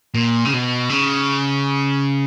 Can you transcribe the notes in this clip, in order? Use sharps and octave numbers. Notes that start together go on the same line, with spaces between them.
A#2
C#3
B2
C#3